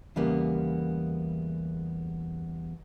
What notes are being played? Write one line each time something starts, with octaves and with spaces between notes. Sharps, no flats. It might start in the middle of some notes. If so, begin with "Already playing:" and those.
E2 C#3 G3 A#3 B3